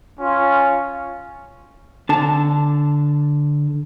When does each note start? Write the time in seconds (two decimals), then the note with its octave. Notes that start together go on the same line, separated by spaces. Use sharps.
0.20 C#4 F4
2.09 D3 A5